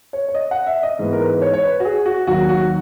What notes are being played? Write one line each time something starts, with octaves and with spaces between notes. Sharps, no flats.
C#5
C#5
D#5
F#5
E5
D#5
G#2 E3 B3
A#4
B4
C#5
C#5
B4
F#4
G#4
F#4
D#2 D#3 F#3 F#4
F#4